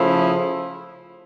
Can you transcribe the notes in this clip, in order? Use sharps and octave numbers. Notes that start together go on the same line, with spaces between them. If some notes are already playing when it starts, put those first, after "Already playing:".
Already playing: C#3 F3 A3 E4